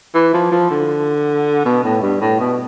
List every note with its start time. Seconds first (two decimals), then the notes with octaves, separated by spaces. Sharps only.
0.15 E3
0.34 F3
0.52 F3
0.70 D3
1.65 B2
1.84 A2
2.02 G2
2.21 A2
2.40 B2